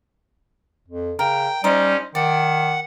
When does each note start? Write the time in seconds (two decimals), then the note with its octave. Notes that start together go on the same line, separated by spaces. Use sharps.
0.88 F2
1.19 C#3 A#4 G5
1.64 G3 C#4 D#4 C5
2.15 D#3 D5 F#5